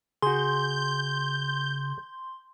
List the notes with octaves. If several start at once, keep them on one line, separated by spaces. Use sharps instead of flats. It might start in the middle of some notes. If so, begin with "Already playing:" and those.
C#3 F#4 G#4 C6 G6